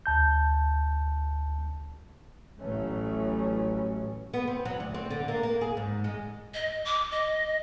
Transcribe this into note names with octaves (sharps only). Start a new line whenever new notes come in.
D2 A5 G6
A1 E3 F#3 A3 C#4
B3
C4
F#3
D2
C4
D3
A#3
A#3
G#4
G#2
G#3
D#5
D6
D#5